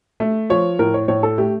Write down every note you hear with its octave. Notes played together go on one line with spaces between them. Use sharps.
A3
F3 C#5
A2 A#4
C#5
A2 C#5
A4
A3 G4